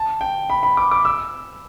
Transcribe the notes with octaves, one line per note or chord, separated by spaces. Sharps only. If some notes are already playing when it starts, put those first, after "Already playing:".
Already playing: A5
G5
B5
B5
D6
D6
E6